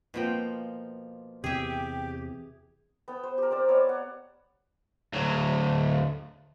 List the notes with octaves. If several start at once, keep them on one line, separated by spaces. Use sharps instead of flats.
B2 F3 A#3 F4 G5
E2 C3 G4 G#4 E5
B3 G5 E6
C5
G4 A#4
C4 G4 D5 E6
B3 C#5 D5 E6
F#5
D2 F#3